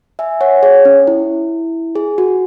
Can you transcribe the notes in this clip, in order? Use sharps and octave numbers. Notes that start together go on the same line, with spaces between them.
E5 G#5
C#5 F#5
G#4 C#5
C#4
E4
G#4
F#4